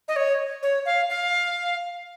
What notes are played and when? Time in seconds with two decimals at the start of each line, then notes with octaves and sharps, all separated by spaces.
0.08 D#5
0.16 C#5
0.63 C#5
0.86 F5
1.10 F5